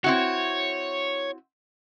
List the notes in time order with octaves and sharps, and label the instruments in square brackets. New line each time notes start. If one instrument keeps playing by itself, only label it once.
[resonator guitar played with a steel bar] C4 E4 F#4 [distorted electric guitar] C#5